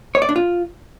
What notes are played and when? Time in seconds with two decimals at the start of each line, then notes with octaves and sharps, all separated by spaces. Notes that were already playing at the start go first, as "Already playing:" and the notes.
0.15 C#5
0.22 D5
0.29 D4
0.36 F4